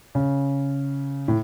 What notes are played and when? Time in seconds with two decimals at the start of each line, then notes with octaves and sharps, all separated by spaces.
0.15 C#3
1.28 A2